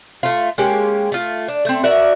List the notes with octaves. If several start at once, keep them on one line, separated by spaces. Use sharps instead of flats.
A3 F4
G#3 A#3 C#4 G4
A3 F4
D4
A3 C4
F#4 A#4 D5 E5